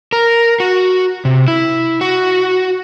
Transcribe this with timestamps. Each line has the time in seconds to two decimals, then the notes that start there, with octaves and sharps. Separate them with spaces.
0.13 A#4
0.60 F#4
1.25 C3
1.48 E4
2.01 F#4